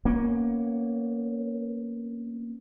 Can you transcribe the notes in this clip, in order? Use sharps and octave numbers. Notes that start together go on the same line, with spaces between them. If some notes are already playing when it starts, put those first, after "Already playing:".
A#3 B3 C#4